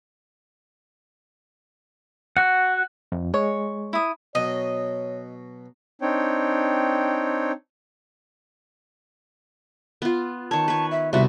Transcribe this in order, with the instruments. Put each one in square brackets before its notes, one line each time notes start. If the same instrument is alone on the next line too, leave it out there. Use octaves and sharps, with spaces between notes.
[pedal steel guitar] F#4 F#5 [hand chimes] F#6
[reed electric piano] F2
[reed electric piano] G#3 [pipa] C#5
[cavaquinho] E4 D#6
[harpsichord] B2 F#3 [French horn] C#5 [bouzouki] D#5
[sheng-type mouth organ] C4 D4 D#4 C#5 G5
[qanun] B3 F4
[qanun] D#3 C#5 [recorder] A5
[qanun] B4 C#5
[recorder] E5
[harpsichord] C2 [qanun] B3 F#4 [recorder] E5